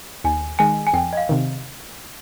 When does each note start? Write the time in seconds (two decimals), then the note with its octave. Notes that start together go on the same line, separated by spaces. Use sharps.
0.24 D#2 G#5
0.59 D#3 G#3 G#5
0.87 G#5
0.93 F2 G5
1.13 D#5
1.17 F5
1.29 C3 D#3